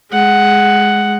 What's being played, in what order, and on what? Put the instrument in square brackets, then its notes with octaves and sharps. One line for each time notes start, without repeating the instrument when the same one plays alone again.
[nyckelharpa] G#3 F#5